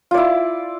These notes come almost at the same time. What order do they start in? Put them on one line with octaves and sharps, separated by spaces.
F4 D5 E4